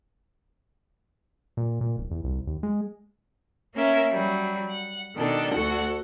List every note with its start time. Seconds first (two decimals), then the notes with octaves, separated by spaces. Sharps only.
1.57 A#2
1.81 A#2
1.98 D1
2.11 E2
2.24 C2
2.47 D#2
2.63 G#3
3.74 A#3 C#4 A#4 E5
4.11 F#3 G3
4.70 F#5
5.15 B2 D#3 D4 A4
5.52 D2 F#4 A4 F#5